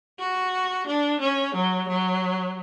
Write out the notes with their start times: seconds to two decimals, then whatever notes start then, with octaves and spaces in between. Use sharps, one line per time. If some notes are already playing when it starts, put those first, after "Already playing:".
0.19 F#4
0.87 D4
1.20 C#4
1.55 F#3
1.89 F#3